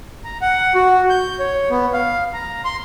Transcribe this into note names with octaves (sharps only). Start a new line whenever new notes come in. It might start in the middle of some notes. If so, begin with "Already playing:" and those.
A#5
F#5
F#4
G6
C#5
B3
F5
A#5
C6